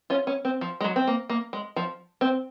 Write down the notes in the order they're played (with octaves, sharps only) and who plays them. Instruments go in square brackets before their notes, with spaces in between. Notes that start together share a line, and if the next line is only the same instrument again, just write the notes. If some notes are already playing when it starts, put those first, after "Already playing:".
[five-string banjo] C#4 F4
C#4
C4
F3
G#3
F#3
C4
A#3
A#3
G#3
F3
C4